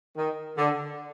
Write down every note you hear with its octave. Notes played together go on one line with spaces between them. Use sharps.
D#3
D3